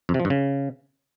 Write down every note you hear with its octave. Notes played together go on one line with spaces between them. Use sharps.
F2
C3
F3
G2
C#3